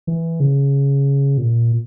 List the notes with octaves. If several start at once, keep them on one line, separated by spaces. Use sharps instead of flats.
E3
C#3
A#2